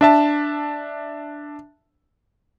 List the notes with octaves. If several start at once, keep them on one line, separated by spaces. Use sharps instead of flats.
D4 E5 A5